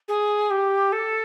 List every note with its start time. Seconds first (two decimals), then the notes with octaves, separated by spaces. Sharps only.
0.08 G#4
0.50 G4
0.92 A4